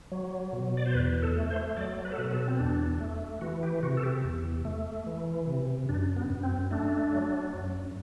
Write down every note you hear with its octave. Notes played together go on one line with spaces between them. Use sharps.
F#3
B2
D5
C5
E2 B4
A4
A3
C5
F#3 D5
B4
A4
B2 B4
A4
C4
E2 D4
A3
E3 F#4
G4
C3 F#4
A4
G4
E2
A3
E3
C3
F#2 D4
B3
F#2
C4
A3 D4
F#3
F#2